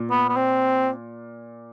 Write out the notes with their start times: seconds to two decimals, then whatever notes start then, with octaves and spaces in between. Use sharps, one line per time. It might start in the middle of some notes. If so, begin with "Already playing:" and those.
Already playing: A#2
0.10 B3
0.29 B3
0.36 C4